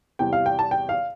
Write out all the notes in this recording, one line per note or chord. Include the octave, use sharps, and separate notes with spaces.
E2 C3 G3 G5
F5
G5
A5
G5
F5